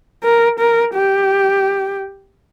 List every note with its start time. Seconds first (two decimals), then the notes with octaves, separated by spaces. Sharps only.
0.23 A#4
0.59 A#4
0.95 G4